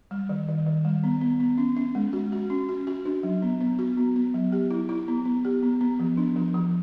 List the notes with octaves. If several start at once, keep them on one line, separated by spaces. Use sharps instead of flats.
G3
D#3
D#3
D#3
G3
B3
B3
B3
C#4
C#4
G#3
F#4
F#4
C#4
F#4
F#4
D4
F#3
B3
B3
F#4
B3
B3
F#3
G4
E4
E4
B3
B3
G4
B3
B3
F3
D4
F3
F3